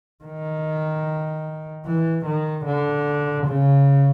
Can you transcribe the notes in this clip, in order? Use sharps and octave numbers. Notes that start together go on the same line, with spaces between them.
D#3
E3
D#3
D3
C#3